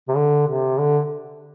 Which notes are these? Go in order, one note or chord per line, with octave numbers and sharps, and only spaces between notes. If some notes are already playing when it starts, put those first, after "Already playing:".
C3
D3
C3
D3